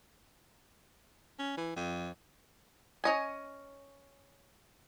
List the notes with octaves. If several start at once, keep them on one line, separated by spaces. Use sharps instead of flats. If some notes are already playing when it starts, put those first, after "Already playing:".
C#4
E3
F2
C#4 D#5 G#5